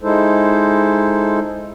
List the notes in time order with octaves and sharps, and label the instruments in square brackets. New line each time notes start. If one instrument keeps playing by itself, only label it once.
[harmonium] G#3 D#4 E4 A4 C5